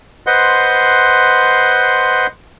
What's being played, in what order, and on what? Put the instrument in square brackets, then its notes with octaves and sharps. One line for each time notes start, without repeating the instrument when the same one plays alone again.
[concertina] B4 C5 D#5 F#5 C6